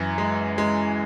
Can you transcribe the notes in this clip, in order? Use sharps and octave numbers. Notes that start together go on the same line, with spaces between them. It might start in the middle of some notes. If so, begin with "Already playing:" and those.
Already playing: F#2 E3
G#3
G#3